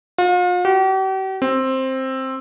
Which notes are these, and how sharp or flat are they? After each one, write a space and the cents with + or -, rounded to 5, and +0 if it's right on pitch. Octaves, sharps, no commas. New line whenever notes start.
F4 +40
G4 -45
C4 +10